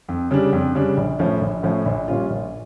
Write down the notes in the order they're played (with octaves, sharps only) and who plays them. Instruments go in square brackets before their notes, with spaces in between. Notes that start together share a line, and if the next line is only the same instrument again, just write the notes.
[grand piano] F2
C#3 G3 D4
F2
C#3 G3 D4
A#1
A2 F3 C#4
A#1
A2 F3 C#4
A#1
A#2 G3 C#4 F4
A#1